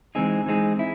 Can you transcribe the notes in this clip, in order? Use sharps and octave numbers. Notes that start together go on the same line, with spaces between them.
E3 G#3 C4 D#4 G#4
E3 G#3 C4 D#4 G#4
E4